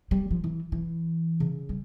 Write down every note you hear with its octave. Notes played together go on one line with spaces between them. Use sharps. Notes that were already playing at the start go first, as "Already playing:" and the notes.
G3
F3
E3
E3
C#3
G3